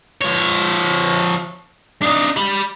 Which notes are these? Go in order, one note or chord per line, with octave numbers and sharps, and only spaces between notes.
F3 C#5
D4 D#4
G4 B5